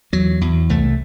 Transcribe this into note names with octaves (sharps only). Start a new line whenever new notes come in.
E2 F#3
E2
C2 A3